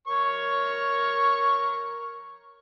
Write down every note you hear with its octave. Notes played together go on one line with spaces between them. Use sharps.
A#4 C#5 C#6